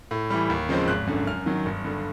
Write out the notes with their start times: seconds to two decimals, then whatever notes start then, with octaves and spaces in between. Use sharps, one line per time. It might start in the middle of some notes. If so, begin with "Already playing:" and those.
0.11 A2
0.30 E3 G3
0.49 D#2
0.69 C#3 F3 G#3 C4
0.88 G#1 F#6
1.07 F#2 D3
1.27 F#2 F6
1.46 D#3 F#3
1.66 G1
1.85 G2 D3